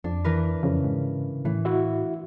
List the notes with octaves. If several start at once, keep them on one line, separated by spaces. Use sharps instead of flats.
F2 D4
E3 A#4 B4
F2 C#3
G#2
A2 E3
E4 F#4 E5